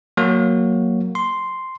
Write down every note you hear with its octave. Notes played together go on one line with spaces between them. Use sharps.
F#3 A#3 F#4
C6